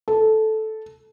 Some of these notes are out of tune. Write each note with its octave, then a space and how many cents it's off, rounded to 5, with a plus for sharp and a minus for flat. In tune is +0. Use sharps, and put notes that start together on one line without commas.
A4 -10